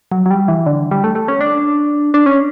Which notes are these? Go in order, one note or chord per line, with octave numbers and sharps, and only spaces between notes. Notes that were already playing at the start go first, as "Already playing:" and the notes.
F#3
F#3
G3
E3
D3
G3
A3
A3
C#4
D4
D4
C#4